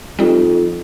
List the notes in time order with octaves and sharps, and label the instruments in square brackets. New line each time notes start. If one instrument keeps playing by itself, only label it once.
[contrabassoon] F2 [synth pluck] G3 D#4